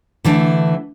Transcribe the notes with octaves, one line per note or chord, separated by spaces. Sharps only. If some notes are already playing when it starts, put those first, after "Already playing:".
D3 E3 A3 D4